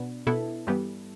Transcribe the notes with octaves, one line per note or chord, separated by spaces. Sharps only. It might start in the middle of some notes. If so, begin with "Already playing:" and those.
Already playing: B2 B3 D4
B2 B3 E4 A4
G2 E3 G3 B3